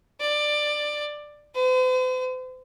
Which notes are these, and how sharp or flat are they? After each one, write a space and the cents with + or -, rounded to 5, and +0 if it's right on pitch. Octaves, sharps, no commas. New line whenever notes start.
D5 +15
C5 -45